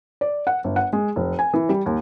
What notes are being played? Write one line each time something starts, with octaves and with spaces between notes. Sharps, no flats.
D5
F#5
G1
F#5
G#3
F1
G#5
E3
G3
D#2